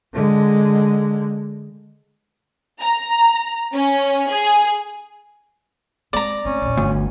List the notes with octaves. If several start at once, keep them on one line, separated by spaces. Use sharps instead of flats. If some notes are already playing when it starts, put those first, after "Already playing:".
D3 G#3
A#5
C#4
G#4
G#3 C4 D5 A#5
A3 C4 C#4
A#1 E2
G1 D2